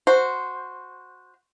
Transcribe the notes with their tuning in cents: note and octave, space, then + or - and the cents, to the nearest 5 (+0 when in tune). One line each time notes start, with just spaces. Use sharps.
F#4 -10 C5 -10